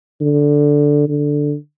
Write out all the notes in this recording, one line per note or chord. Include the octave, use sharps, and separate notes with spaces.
D3
D3